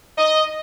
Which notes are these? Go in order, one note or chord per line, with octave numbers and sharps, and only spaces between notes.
D#5